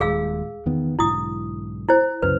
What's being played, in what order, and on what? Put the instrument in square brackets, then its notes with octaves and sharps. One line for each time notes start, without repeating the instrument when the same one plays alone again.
[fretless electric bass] D#1 G#3 [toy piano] G#4 F5 E6
[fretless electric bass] E2 D#3 B3
[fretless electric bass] B1 G#2 D3 [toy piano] E4 D#6
[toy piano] E4 C5
[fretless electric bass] C2 F#2 C#3 [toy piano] B4